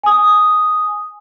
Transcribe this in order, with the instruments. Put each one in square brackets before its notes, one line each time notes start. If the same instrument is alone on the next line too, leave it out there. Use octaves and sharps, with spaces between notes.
[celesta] G#5 D#6